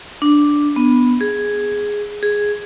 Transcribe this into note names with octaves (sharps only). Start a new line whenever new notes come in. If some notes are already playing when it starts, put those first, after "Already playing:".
D4
B3
G#4
G#4